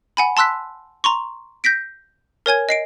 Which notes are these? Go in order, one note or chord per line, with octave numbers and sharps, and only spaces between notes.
F#5 G#5 B5
A5 C6 E6 F#6 B6
A#5 C6 C#6
G6 A#6 B6 D7
A#4 C#5 G#5 G#6
D#5 C7 D7